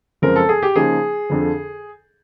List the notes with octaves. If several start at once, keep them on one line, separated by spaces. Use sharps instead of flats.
F#2 C#3 F3 G#3 C4 A#4
A4
G#4
G4
C#3 F3 A#3 D#4 G#4
F2 D3 F3